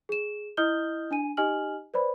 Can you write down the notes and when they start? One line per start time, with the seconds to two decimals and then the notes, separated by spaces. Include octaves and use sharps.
0.09 G#4 E7
0.57 E4 D#5 D#6 F6 G6 G7
1.11 D4 G#5 D#7
1.37 D#4 G4 D#5 G#5 F6 F#7
1.94 B4 C5 D5 B5